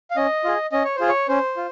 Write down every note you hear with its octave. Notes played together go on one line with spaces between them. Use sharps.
F5
C#4 D#5
F4 G#4
C#4 D#5
C#5
F4 G#4 C5
C#5
C#4 C5
F4